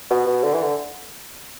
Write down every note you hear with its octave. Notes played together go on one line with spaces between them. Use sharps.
B2
B2
D3
E3
D3